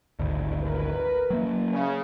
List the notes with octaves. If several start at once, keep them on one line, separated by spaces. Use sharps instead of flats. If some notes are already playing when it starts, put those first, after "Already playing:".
G#1 D2
A#4 B4
F#3 A#3
C#3